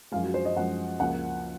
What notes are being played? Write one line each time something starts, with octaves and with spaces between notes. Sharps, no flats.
F#2 F3 G#3 F5
F#4
C5
D#5
F#2 F3 G#3 F#5
C#2 C#3 F3 A#3 F#5